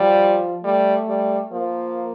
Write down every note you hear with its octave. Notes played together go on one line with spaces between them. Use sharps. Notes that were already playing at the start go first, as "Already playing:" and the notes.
Already playing: F3 G3
G3 A3
G3
F3 A#3